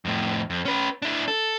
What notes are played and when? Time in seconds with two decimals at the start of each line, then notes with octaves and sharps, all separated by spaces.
0.05 F2 A2
0.50 F2
0.65 C#4 B4
1.02 D4 E4
1.28 A4